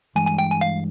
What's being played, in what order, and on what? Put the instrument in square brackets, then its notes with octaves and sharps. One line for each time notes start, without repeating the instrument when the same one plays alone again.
[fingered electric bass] G2 E3 G#3 [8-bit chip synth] G#5
[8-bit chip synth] G#5
G5
G#5
F5